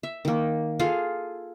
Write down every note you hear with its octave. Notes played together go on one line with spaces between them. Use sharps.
E5
D#3 A#3
F4 G#4 A4 F5